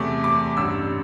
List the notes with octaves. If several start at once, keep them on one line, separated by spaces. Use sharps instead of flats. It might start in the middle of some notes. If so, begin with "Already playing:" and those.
Already playing: E2 C3 A3 D6
D6
A1 G2 G3 E6